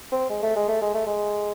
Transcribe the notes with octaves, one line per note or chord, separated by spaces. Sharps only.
C4
G#3
A3
G#3
A3
G#3
A3
G#3